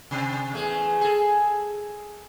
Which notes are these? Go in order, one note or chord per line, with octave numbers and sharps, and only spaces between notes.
C3 C4
E2 A3 G#4
G#4 A4